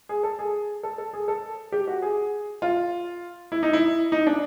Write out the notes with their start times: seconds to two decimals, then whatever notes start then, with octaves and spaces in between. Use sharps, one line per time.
0.09 G#4
0.23 A4
0.39 G#4
0.83 A4
0.98 A4
1.13 G#4
1.28 A4
1.72 G4
1.87 F#4
2.02 G#4
2.62 F4
3.52 E4
3.63 D#4
3.73 E4
4.12 D#4
4.27 D4